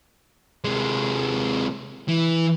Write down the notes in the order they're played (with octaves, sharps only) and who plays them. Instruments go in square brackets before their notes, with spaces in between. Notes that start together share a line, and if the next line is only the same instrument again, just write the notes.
[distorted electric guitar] C3 G#3
E3